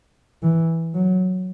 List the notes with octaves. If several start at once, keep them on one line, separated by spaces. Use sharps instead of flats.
E3
F#3